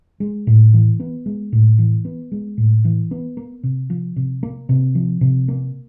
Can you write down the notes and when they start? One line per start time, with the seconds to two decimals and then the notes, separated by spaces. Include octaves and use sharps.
0.20 G#3
0.47 A2
0.74 E3
1.00 B3
1.26 G#3
1.52 A2
1.79 E3
2.05 B3
2.32 G#3
2.58 A2
2.85 E3
3.11 B3
3.37 A#3
3.63 C3
3.90 F3
4.16 C3
4.43 A#3
4.69 C3
4.95 F3
5.21 C3
5.48 A#3